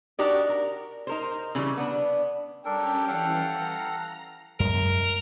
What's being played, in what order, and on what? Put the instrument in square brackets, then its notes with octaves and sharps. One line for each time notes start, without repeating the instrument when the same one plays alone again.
[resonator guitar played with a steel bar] D4 D#4 F#4 G4 A#4 D5
A#4
D#4 A#4 C5
C#3 E3 G3
B3 D4
[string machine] G3 C#4 G4 [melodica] D4 A4 A#4 [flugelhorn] G5
[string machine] E3 [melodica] A4 F5 F#5
[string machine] A#5
[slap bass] F#2 G#3 [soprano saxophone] A#4